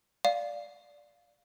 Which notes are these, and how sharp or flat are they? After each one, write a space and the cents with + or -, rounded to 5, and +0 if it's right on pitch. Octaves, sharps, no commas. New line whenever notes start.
D5 +0 F5 +0